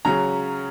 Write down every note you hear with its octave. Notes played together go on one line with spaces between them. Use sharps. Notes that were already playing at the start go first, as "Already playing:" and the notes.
C#3 F#3 C#4 A#5